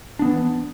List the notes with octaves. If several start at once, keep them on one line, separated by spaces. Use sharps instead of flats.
E3 B3 D4